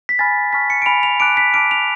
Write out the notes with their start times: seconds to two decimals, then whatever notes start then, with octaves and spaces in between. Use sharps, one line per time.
0.09 B6
0.19 G#5 B5 F6 A6
0.53 A5 C#6 F6 B6
0.70 C#7
0.82 D7
0.86 G#5 B5 F6 F7
1.03 F7
1.20 A5 D6 F#6 D7
1.37 B6
1.54 A5 D6 F6 D7
1.71 F7